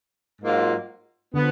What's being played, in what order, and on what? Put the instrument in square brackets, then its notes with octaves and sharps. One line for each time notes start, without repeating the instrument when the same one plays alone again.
[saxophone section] G#2 F#3 A#3 F4
[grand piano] D3 [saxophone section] F3 B3